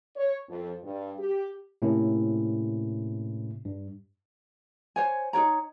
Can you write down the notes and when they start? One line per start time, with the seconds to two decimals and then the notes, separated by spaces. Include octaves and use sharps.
0.16 C#5
0.49 F2
0.83 G2
1.19 G4
1.82 A2 C3 A#3 C#4 E4
3.65 G2
4.96 C5 C#5 G#5
5.33 D#4 A#4 C#5 A#5